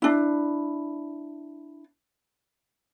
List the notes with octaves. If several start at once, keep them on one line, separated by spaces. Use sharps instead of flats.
D4 E4